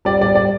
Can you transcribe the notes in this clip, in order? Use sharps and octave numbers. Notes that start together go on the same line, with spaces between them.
G3 D5
D5
G3
D5